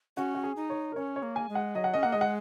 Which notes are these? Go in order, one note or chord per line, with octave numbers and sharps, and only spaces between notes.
C#4 F#4
F#4
G#4
D#4
C#5
A#4
C#4 C#5
C#5
A#3
G#5
G#3
F#5
F#3 D#5
F#5
C#4 D#5
A#3 F#5
G#3 D#5
F#5